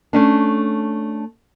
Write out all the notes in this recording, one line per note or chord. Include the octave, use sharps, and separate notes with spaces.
A3 C#4 D4